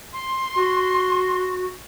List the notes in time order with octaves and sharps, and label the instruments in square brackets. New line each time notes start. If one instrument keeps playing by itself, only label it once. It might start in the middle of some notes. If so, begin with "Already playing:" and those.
[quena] C6
[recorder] F#4